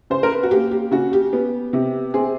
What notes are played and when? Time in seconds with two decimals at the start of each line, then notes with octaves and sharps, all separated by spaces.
0.10 C#3 C5
0.23 A#4
0.32 B4
0.43 F#4
0.51 A#3 G4
0.71 G4
0.91 C#3 F#4
1.13 G4
1.33 B3
1.73 C3
2.14 C4 G#4